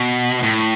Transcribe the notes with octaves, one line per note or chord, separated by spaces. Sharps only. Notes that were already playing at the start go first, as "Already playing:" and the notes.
Already playing: B2
A2